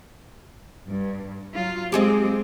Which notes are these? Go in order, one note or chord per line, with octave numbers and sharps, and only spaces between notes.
G2
F#3 F4
G#3 C4 G4 G#4 D#5